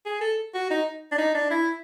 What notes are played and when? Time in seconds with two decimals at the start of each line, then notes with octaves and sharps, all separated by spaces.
0.06 G#4
0.21 A4
0.54 F#4
0.70 D#4
1.12 D4
1.18 D#4
1.35 D4
1.50 E4